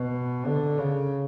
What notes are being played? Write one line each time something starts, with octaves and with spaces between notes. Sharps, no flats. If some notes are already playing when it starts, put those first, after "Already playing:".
Already playing: B2
D3
C#3